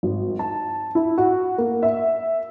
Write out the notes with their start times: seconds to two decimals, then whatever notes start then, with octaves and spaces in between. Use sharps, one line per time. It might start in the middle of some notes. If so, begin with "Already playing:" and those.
0.03 G#1
0.39 A5
0.95 E4
1.18 F#4
1.58 A#3
1.83 E5